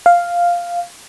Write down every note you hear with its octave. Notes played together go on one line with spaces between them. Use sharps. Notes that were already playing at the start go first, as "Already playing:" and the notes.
F5